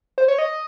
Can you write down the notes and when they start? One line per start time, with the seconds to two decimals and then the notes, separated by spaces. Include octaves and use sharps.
0.18 C5
0.28 C#5
0.39 D#5